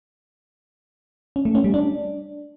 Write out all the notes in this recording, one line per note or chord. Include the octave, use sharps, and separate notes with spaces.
C#4
A3
C#4
G3
D4